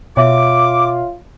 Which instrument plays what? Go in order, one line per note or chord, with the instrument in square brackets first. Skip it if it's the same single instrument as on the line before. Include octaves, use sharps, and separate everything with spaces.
[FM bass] B2 [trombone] F4 [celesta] C#5 E5 [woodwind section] D6